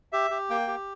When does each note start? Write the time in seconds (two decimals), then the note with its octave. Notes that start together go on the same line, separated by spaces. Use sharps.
0.12 G4 E5
0.31 G4
0.50 A#3 G5
0.67 G4